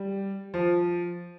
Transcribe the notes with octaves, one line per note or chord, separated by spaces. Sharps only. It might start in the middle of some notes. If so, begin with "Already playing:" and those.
Already playing: G3
F3